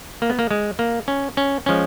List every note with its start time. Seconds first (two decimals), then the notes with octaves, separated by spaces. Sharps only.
0.22 A#3
0.30 B3
0.39 A#3
0.51 G#3
0.79 A#3
1.08 C#4
1.37 C#4
1.66 F3 G#3 C#4